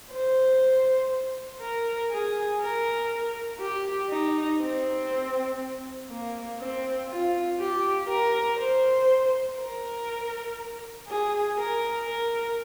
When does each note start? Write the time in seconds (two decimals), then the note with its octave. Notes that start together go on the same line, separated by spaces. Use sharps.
0.11 C5
1.61 A#4
2.11 G#4
2.60 A#4
3.60 G4
4.10 D#4
4.60 C4
6.09 A#3
6.59 C4
7.09 F4
7.59 G4
8.08 A#4
8.58 C5
9.58 A#4
11.08 G#4
11.58 A#4
12.08 A#4